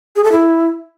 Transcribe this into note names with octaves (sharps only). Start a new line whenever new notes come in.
G#4
A4
E4